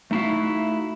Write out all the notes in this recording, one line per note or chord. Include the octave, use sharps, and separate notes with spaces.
A3 D#4 E4 F#4 F5